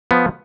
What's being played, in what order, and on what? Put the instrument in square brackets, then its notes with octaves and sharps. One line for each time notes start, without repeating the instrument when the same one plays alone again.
[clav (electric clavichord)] F3 B3